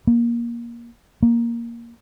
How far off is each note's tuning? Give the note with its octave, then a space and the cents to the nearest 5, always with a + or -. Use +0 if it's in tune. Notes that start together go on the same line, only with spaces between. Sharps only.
A#3 +15
A#3 +5